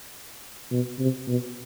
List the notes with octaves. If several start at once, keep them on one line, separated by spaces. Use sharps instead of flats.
B2
C3
B2